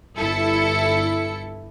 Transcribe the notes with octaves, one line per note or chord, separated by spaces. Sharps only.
G1 E4 A4 C#7